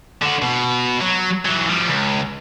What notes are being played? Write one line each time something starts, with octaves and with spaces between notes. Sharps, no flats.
D3 F#4
B2
F#3
E3 F#3
F3 G3
C#2